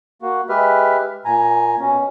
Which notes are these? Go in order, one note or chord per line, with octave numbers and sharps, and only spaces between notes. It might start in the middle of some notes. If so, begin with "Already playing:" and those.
A#3 F#4
G#3 G4 B4 E5 F6
A#2 G#5 A#5
B2 C#4